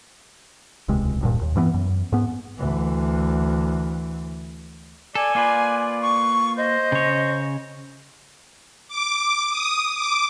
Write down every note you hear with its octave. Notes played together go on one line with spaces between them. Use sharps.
D#1 C#2 C3 G#3
D#1 G2 A#2
D#2
G2 E3 A3 B3
F#2
G#2 B3
D2 E3
A4 D5 G#5
A#3 F4 B4 D5
C#6
C5 D#5
C#3 C#5
D6
D#6
D6